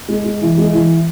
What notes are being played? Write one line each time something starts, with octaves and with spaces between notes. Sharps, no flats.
G#3
G#3
E3
G#3
E3